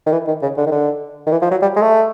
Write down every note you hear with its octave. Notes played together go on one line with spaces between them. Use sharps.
D#3
E3
D#3
C#3
D3
D#3
D3
D#3
E3
F3
F#3
G3
G#3
A3